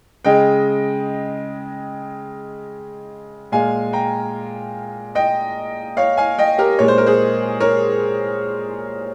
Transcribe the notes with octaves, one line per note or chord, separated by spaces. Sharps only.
C#3 G#3 D#5 G5
A#2 G#3 F5 G#5
G5 A#5
D#5 G5
C#5 F5
F5 G#5
D#5 G5
G4 A#4
A#2 G#3 C#5
C5
A#4
G#4 C5
A#4 C#5